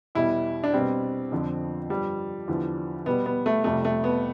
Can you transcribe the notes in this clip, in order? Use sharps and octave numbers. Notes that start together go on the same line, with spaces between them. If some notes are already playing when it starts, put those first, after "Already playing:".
E2 B2 G3 E4
D4
B2 G3 C4
F2 D3 F3
G2 F3 G3
E2 D3 F3
B2 G3 B3
B3
A3
F2 C3 G3 A3
A3
B3